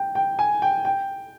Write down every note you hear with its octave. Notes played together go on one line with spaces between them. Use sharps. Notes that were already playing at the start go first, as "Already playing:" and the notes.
Already playing: G5
G5
G#5
G5
G5